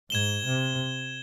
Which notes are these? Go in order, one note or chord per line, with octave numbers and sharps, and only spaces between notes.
G#2 G#6 E7 G7
C3